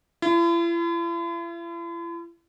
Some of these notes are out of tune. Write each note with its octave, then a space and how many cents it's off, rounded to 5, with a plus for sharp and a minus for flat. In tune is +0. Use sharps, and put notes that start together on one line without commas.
E4 +45